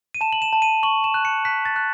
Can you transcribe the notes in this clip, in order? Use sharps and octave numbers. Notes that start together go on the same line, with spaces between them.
D#7
A5 E7
F#7
E7
A5
D#7
C#6 F#7
E7
F#6
C#7
F#6 B6
A6
F#6